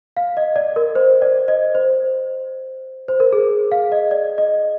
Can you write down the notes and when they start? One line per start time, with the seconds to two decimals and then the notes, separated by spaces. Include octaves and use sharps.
0.17 F5
0.37 D#5
0.56 D5
0.76 A#4
0.95 C5
1.22 D5
1.48 D#5
1.75 C5
3.08 C5
3.20 A#4
3.32 G#4
3.72 F5
3.92 D#5
4.11 D5
4.38 D#5